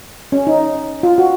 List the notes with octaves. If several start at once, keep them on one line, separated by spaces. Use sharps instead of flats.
C#4
D#4
F4
F#4